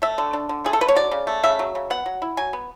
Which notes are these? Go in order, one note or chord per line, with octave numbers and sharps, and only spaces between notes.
A3 E5
D3
D4
D3
A3 G#4
A4
D3 B4
C#5
F#3 D5
C#3
A3
C#3 E5
F#3
C#3
B3 F#5
F#3
E4
F#3 G#5
B3